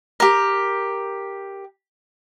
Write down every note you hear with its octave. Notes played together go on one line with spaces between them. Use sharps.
G4 A#4